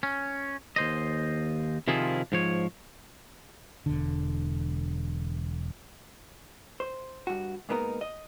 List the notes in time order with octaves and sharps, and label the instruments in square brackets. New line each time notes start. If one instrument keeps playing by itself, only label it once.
[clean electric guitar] C#4
D#2 C5 D#5
C3 D#3 F3 E4 F4 G#4
G#2 F3 C#5
[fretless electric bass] E1 D3
[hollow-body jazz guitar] C5
G2 F#4
G#2 A#3 B3 D#4 A#4
D#5